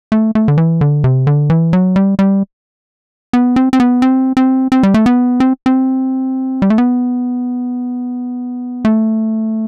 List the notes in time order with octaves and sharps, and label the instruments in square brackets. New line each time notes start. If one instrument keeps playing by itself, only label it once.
[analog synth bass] A3
A3
D3
E3
D3
C3
D3
E3
F#3
G3
G3
B3
C4
C4
B3
C4
C4
C4
G3
A3
B3
C4
C4
G3
A3
B3
A3